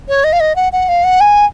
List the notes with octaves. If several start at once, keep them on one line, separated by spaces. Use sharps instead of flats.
C#5
D#5
F5
D#5
F#5
F#5
F5
F#5
G#5